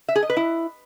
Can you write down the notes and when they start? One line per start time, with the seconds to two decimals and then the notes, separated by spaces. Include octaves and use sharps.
0.08 E5
0.16 G#4
0.23 D#5
0.30 B4
0.37 E4